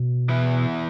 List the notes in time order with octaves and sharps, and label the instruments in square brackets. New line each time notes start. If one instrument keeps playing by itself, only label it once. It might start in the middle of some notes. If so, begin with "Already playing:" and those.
Already playing: [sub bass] B2
[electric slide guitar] E3 B3 E4